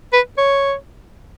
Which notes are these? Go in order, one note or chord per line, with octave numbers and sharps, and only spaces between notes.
B4
C#5